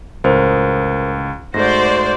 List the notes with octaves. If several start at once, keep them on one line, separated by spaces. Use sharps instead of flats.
C#2 A2 A#4 C5
G#2 A3 F#4 C5 D5 A#6